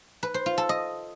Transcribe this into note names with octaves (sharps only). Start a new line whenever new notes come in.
B4
C5
F4
A4
D#5